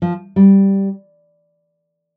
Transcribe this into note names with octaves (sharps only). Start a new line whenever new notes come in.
F3
G3